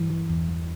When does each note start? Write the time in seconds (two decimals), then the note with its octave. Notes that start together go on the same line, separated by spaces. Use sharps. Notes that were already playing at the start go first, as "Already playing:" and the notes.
Already playing: G2 E3
0.10 E3
0.29 E2
0.49 E2